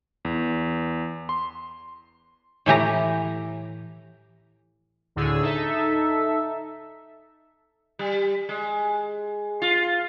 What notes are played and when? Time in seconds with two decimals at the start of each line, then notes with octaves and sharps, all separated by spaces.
0.25 E2
1.29 C6
2.66 A2 E3 G4 A#5
5.16 D2 A2 D3 G#4 E6
5.42 D#4 A4 E5
7.99 G3
8.49 G#3
9.62 F4